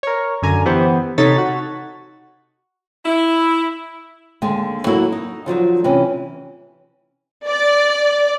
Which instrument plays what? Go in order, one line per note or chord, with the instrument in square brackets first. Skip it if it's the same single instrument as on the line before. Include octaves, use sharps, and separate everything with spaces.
[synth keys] A#4 C#5
F#2 D3 G#5 A#5
E3 B3 G4 C5
C3 D#4 A4 C#5 A6 B6
F#4
[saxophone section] E4
[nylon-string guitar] D#2 D3 G#3
F#3 A#3 E4 F#4 A4 C#5
D#4
D3 F3 F#3 D#4
C3 E3 C#4
[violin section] D5